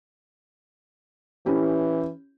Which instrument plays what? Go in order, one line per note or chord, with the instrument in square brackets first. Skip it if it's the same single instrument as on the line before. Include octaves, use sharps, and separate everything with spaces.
[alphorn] E3 [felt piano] C#4 E4 G4